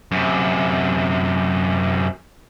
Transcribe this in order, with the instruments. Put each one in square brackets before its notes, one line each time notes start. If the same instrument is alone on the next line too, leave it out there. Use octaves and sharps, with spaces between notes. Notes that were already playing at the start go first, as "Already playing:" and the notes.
[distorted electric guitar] F#2 C3